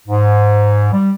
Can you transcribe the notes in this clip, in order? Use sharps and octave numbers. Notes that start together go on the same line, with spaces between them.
G#2
G3